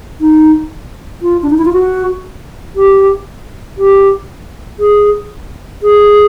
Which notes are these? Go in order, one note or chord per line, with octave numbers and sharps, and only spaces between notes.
D#4
F4
D4
D#4
E4
F4
F#4
G4
G4
G#4
G#4